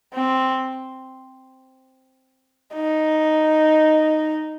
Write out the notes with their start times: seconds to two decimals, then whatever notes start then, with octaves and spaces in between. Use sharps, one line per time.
0.14 C4
2.76 D#4